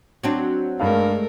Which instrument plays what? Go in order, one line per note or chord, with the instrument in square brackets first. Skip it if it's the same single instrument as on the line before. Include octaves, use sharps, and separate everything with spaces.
[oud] F#3 C4 D4
[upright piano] G2 F5 [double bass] G#3 A3 [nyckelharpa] A4 A#4